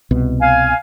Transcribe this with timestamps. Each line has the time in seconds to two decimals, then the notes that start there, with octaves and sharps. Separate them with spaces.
0.11 C2 B2
0.41 F5 G#5